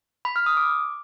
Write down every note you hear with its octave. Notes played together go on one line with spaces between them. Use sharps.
B5
F6
D#6
D6